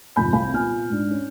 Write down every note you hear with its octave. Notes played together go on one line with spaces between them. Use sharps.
G#1 F2 C3 F3 B5 G6
C2 C4 F5 B5
A#2 B3 G#5 F6
G#2 D4
C#4